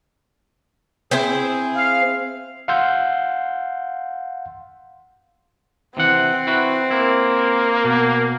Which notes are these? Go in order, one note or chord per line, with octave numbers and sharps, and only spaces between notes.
C4 E4 G#4 C5
F5
F5 F#5 C6 E6 G6
C3 E3 C4 F#5
E4 F#4 B4
A#3 E4
B2